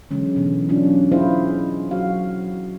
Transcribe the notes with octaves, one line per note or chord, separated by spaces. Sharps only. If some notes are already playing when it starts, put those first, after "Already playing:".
D3 E3 F#3 G#3 C#4
B2 E3 B3
F#3 C#4 D4 F4
E4 F4 G#4 C5 D#5 F5
F#3 F#4 F5